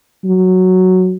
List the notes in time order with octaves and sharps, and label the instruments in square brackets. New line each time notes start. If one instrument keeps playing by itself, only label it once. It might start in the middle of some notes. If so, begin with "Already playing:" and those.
[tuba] F#3